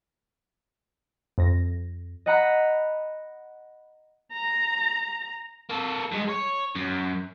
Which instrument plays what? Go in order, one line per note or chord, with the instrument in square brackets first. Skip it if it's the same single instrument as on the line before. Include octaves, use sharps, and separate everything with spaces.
[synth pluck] F2 A#6
[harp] D#5 F#5 A#5 B5
[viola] A#5
[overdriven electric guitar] A#3 A4
G2 G#3
C#5
F#2